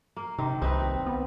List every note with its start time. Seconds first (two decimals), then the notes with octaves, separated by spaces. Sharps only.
0.16 A#3
0.38 C3 D#3
0.62 C2 C4 D#4 B4
1.06 B3